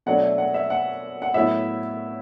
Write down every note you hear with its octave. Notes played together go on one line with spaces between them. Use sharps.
B2 F#3 A3 D4 F#5
E5
F#5
E5
F#5
F#5
A2 F#3 B3 E4 E5